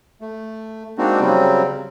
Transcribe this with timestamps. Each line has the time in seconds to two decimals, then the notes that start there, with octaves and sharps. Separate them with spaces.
0.21 A3
0.98 G#3 A#3 C4 D4 D#4 F#4
1.20 C#3 F#3 G3 C4